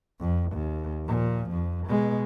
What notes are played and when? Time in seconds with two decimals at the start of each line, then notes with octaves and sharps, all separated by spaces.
0.20 F2
0.52 D#2
1.07 A#2 F3
1.51 F2
1.87 B2 G#3